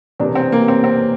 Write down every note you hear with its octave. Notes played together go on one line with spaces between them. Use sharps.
E1 E2 C3 D4
C4
A#3
C4
C4